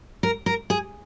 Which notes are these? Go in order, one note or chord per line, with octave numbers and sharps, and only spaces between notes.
A#4
A#4
G#4